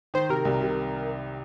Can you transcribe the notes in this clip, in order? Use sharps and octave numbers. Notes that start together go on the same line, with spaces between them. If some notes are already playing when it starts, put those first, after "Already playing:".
D#3 C5
C3 A#4
C2
C3